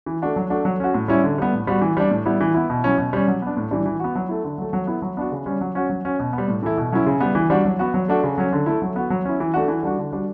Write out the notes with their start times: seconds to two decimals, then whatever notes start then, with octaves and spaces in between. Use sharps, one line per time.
0.06 E3
0.22 A3 D4 F#4
0.36 F#3
0.50 A3 D4 F#4
0.65 F#3
0.80 C#4 F#4
0.94 A2
1.08 G3 C#4 E4
1.24 D3
1.38 G3 B3
1.53 A2
1.67 G3 B3 F#4
1.81 E3
1.97 G3 D4
2.11 A2
2.26 G3 B3 E4
2.41 E3
2.54 B3 E4
2.70 B2
2.84 F#3 C#4 E4
2.98 B2
3.13 G3 C#4
3.28 F#3
3.42 B3 D4
3.57 A2
3.71 E3 G3 D4
3.86 E3
4.00 B3 F#4
4.15 F#3
4.29 A3 E4
4.45 D3
4.58 F#3 A3
4.73 F#3
4.87 B3 E4
5.02 F#3
5.17 B3 D4 F#4
5.32 C#3
5.46 G3 C#4
5.61 F#3
5.75 C#4 F#4
5.89 F#3
6.05 C#4 F#4
6.19 B2
6.33 B3
6.38 G3
6.48 A2
6.63 E3 A3 E4
6.77 B2
6.92 F#3 C#4 E4
7.07 C#3
7.21 G3 B3
7.35 E3
7.50 G3 D4 F#4
7.65 F#3
7.79 B3 F#4
7.94 F#3
8.08 A3 D4 F#4
8.24 C#3
8.38 F#3 C#4
8.53 D3
8.66 A3 E4
8.82 F#3
8.96 B3 F#4
9.10 F#3
9.25 C#4 E4
9.40 E3
9.54 A3 D4 F#4
9.68 E3
9.83 G3 D4 F#4
9.98 D3
10.13 G3 D4 F#4